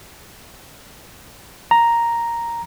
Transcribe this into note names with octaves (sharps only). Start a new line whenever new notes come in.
A#5